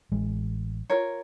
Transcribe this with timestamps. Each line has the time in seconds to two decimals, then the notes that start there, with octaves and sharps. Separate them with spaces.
0.12 A1 G#3
0.90 F4 A#4 C#5